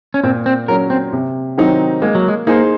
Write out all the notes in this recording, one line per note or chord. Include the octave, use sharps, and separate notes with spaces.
C#4
A#2 C4
C4
F#3 C#4 A#4
C4
C3
D#3 F#3 C4 D#4
G#3 A#3
F#3
G#3
A#3 D#4 G#4 C5